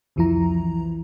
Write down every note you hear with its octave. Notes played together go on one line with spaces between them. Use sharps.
C2 F2 E3 F3 E4 A#5